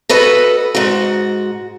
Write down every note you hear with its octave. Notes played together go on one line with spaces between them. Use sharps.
F#4 A4 B4 D#5
G#2 F#4